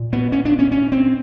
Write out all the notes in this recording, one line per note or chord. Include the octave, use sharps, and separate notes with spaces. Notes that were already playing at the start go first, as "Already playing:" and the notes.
Already playing: A#2
B3
C#4
D4
C#4
C#4
C4